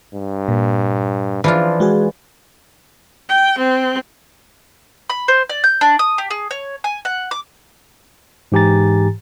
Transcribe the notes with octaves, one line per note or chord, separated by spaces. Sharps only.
G2
A#2
E3 F3 D4 F4
G#3 F#4 G#4
G5
C4
B5
C5
D5
G6
D4
D#6
G4
G#4
C#5
G#5
F#5
D6
G#2 E3 G4 G#5 A#5 A6